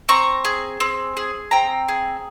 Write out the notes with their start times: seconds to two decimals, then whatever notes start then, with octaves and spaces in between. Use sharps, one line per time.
0.09 C4 A#5 C#6
0.45 G#4
0.80 C4
1.17 G#4
1.51 C4 G5 A#5
1.88 G#4